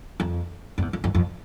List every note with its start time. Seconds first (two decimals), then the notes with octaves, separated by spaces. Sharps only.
0.20 F2
0.78 F2
0.82 E2
0.93 F2
1.04 F2
1.15 F2